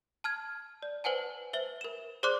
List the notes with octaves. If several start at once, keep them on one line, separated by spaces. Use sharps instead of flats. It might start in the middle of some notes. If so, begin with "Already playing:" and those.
A5 F6 G#6
D5
B4 C5 F#5 G#5 A5
B4 C5 E5 G7
A#4 E7
G#4 C5 D5 C6 D6 F#6